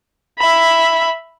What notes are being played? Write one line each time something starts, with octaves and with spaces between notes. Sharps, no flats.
E5 B5